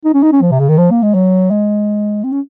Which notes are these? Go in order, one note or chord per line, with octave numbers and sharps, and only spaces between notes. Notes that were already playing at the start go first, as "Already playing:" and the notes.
D#4
C#4
D#4
C#4
F3
C3
C#3
D#3
F3
A#3
G#3
F#3
G#3
C4
C#4